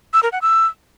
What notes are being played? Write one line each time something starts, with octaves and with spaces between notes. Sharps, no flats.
E6
A#4
F#5
E6